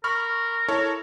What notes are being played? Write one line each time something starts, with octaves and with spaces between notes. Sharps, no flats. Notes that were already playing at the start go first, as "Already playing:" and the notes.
A#4 B5 C#6 F6
E4 A4 C#5